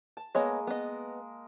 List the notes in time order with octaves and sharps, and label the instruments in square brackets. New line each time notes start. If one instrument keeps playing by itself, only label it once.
[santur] A5
[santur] G#3 A#3 [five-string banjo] B3 C#5 D#5
[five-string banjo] B3 D#5